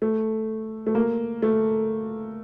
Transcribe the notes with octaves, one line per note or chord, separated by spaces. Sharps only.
A3
A3
A#3
A3